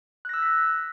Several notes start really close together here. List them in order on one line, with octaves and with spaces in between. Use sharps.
F#6 A#6 E6 G6 B6